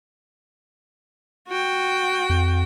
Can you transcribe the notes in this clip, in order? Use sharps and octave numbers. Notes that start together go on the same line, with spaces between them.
F#4 G5
F2